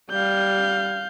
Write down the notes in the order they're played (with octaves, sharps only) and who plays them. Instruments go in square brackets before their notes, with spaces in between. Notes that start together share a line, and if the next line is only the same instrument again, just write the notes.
[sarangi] G3 [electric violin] F5 G6